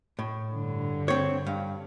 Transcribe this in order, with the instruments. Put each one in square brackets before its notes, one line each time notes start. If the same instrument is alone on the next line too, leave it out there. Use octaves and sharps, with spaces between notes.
[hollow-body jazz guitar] A2
[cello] G2 D3
[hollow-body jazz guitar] C4 C#5
G2 F5